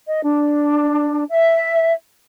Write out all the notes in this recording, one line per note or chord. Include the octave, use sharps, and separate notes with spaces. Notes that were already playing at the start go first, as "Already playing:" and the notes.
D#5
D4
E5